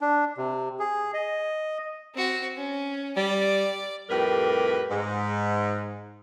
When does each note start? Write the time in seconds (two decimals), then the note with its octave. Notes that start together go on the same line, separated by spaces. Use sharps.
0.01 D4
0.38 C3
0.79 G#4
1.14 D#5
2.14 C4 F#4
2.57 C#4
3.17 G3 D5
4.10 F2 A2 G3 G4 A#4 B4
4.91 G#2